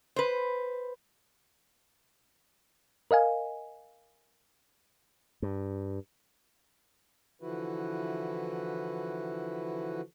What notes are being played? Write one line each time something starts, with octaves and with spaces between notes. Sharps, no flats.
B4 C5
A#4 D#5 F5 G#5
G2
D3 E3 F3 E4 F#4 B4